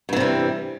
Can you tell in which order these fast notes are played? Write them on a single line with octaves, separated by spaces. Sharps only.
G2 E3 C3 G3